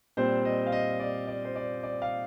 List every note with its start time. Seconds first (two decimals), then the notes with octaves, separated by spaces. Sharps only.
0.17 A#2 G3 C4 C5
0.45 D#5
0.67 F5
0.72 D#5
1.00 D5
1.27 D5
1.45 C5
1.56 D5
1.83 D5
2.02 F5